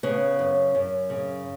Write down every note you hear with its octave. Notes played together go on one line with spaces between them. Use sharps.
C#3 B3
F#2
F#2
C#3